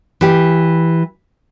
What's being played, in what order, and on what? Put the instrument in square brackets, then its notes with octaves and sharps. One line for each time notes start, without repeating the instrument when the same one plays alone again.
[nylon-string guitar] E3 G4